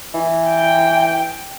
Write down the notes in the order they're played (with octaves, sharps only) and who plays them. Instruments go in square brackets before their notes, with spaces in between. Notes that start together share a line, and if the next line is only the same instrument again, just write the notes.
[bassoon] E3
[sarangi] G5